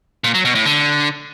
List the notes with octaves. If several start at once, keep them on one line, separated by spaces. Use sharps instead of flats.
A#2
F#3
B2
A2
D3